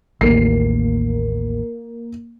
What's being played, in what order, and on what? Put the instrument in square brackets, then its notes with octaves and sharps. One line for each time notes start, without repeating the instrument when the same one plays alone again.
[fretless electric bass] A1 D#2 [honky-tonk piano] A#3 C7